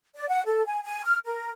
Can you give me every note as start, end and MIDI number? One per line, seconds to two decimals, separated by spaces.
0.16 0.28 74
0.28 0.42 78
0.46 0.64 69
0.66 0.81 80
0.83 1.04 80
1.05 1.17 89
1.25 1.50 70